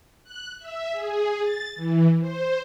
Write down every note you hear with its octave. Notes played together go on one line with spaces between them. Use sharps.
F#6
E5
G#4
A6
E3
C5